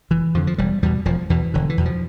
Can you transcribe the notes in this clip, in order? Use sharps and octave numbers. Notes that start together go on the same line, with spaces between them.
F1 E3
F2 D3 F3
F3
E1 G3
E2 B2 G3
E1 F3
E2 B2 E3
E1 D3
E3
E2 B2
F3